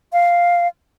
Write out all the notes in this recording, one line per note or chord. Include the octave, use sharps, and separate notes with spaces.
F5